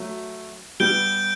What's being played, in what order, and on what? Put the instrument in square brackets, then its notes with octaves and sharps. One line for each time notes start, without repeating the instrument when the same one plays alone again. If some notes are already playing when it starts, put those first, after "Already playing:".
Already playing: [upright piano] F#3 A3
[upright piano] G3 B3 [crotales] G6 D7 G7